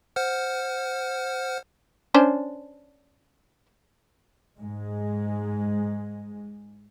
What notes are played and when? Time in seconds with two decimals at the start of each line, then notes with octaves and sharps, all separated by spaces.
0.16 C5 F#5 F6
2.14 C#4 D4 C5
4.57 G#2 G#3